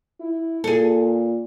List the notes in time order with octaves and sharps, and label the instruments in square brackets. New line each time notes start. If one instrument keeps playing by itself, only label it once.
[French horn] E4
[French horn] A#2 [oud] G#4 A4